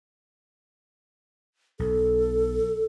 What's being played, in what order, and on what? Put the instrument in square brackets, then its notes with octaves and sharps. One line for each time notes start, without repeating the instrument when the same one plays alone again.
[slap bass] B1 [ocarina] A4